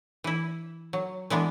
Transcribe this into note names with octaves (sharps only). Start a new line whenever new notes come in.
E3 E4
F#3
E3 G#3 B3 D4